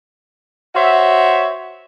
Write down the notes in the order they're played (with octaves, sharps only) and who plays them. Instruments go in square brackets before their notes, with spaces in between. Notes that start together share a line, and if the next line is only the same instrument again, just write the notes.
[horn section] F#4 C5 C#5 E5